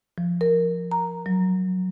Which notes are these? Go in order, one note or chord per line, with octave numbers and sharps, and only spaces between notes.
F3
A#4
A#5
F#3